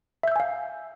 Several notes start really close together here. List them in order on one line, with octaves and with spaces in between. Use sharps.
E5 G6 E6 G#5 F5